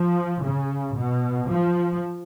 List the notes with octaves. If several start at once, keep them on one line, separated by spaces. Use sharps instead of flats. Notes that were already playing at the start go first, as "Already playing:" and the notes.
Already playing: F3
C#3
B2
F3